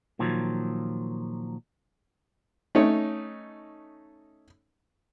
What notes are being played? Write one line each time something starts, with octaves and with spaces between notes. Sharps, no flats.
A#2 D#3 F3 F#3
A3 C#4 D#4 C#5